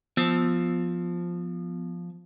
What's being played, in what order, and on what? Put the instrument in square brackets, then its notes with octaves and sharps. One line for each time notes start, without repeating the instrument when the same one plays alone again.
[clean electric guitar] F3 [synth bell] B3